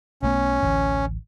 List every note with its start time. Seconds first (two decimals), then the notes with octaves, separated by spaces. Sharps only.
0.22 B1 A3 B3 C#4
0.62 A1 D2 A2